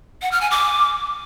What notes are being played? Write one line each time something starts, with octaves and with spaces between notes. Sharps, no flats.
F#5
F6
G#5
D6